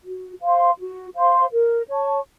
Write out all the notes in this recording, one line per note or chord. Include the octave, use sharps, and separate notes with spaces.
F#4
C5 F5 C6
F#4
C5 F5 C6
A#4
C#5 A5 C#6